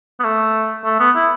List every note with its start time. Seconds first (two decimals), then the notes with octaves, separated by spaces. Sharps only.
0.19 B3
0.24 A3
0.85 A3
1.00 B3
1.16 E4